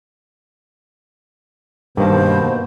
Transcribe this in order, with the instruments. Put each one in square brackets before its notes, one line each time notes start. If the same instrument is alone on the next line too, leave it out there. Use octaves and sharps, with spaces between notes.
[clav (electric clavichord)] G2 D#3 A5 [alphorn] B2 [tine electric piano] A#3 [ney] C5